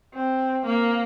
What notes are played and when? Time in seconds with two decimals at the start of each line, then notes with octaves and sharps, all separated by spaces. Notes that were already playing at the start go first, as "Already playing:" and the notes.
0.14 C4
0.66 A#3